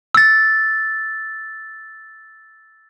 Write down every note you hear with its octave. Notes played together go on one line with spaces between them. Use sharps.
E6 A6